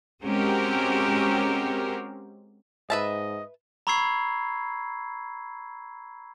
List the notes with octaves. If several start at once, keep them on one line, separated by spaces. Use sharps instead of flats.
G#3 C4 C#4 F#4 G4 A#4
G#2 B4 D#5 E5 A5
A#5 B5 C#6 E6 G#6 C7